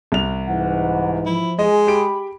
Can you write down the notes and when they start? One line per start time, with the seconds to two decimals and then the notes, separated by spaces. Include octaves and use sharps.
0.12 C2 F7
0.47 G#2 E3 F#5
1.26 F3 E4
1.59 G#3 G#4 D#5
1.87 G4 B5 D7